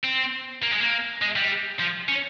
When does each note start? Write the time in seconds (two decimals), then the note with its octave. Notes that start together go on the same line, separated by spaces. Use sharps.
0.04 C4
0.63 A#3
0.72 G#3
0.81 A#3
1.21 G#3
1.36 G3
1.80 F3
2.09 C#4